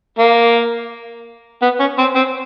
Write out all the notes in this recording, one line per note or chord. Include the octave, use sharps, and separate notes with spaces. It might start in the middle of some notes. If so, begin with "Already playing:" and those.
A#3
B3
C#4
C4
C4